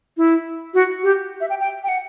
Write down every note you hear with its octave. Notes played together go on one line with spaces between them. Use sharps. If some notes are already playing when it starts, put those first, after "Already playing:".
E4
F#4
G4
E5
G5
G5
G5
F#5